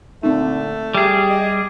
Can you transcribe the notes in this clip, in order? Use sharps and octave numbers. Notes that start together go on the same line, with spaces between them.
A#2 D3 A3 C4 D#4
G3 G4 G#4
D#5